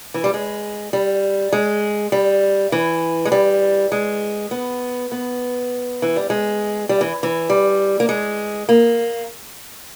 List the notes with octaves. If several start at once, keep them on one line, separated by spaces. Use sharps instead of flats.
E3
G3
G#3
G3
G#3
G3
E3
G#3
G3
G#3
B3
B3
E3
G3
G#3
G3
E3
E3
G3
A#3
G#3
A#3